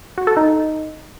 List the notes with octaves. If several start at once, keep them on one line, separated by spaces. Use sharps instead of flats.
F#4
A4
D#4